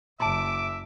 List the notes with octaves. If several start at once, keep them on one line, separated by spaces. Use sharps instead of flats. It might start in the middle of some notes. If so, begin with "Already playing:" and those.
F#1 E5 A5 C6 D6 D7